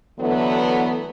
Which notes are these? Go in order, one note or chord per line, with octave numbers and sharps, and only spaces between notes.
D3 E3 F#3 A3 B3